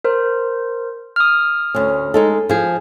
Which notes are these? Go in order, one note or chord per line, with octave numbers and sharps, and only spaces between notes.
A#4 C5
D#6 F6
D2 C#4
G#3 D#4 A4
F3 G#4